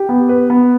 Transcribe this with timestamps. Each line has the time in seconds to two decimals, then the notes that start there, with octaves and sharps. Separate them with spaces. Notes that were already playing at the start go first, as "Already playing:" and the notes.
Already playing: G4
0.09 B3
0.29 B4
0.50 B3